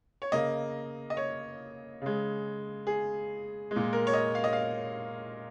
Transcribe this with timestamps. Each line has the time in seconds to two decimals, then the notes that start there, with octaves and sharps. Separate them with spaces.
0.22 C#5
0.32 C#3 A#3 D#5
1.10 D#5
1.17 C#5
2.02 C#3 G#3
2.87 G#4
3.71 G#3
3.76 A#2
3.93 A#4
4.07 C#5
4.13 D#5
4.35 F5
4.44 D#5
4.53 F5